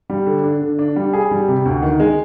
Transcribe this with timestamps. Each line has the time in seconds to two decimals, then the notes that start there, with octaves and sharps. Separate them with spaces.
0.10 G3
0.26 D3
0.44 D4
0.62 D3
0.79 D4
0.96 G3
1.13 G#4
1.31 G3
1.48 C3
1.65 D2
1.82 D#3
2.00 G#3